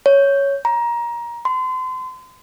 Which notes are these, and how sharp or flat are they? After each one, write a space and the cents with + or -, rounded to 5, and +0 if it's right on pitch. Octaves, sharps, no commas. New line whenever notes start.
C#5 +0
A#5 +20
C6 -35